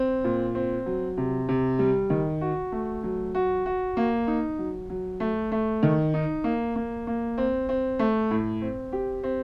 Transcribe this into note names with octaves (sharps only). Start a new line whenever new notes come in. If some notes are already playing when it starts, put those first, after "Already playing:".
Already playing: C4
A#2
C4
F#3
C3
C3
G3
D#3
F#4
A3
F#3
F#4
F#4
A#3
D#4
F#3
F#3
A3
A3
D#3
D#4
A#3
A#3
A#3
C4
C4
A3
A2
C4
G4
C4